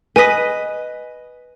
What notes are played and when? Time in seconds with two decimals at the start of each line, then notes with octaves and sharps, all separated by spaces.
0.16 B4 D#5 G#5 B6